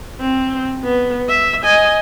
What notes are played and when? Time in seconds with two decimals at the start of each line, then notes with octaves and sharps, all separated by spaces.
0.20 C4
0.84 B3
1.29 E5
1.64 D#5 G#5